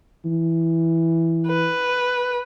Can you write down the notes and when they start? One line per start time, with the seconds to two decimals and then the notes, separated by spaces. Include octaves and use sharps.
0.25 E3
1.47 B4